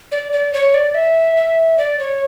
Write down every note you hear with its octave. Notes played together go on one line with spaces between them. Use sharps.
D5
D5
C#5
D5
E5
E5
D5
C#5